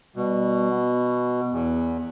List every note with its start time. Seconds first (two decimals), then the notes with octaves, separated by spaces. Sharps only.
0.16 B2 G3
0.71 B3
1.53 E2